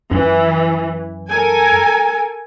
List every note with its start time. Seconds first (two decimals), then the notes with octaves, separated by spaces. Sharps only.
0.12 F#2 E3
1.29 A4 A#4 G#5